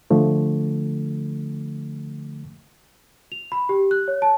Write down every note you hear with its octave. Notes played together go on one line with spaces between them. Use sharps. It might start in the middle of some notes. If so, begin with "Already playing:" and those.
D3 F3 A3
F7
B5
G4
F#6
C#5
A5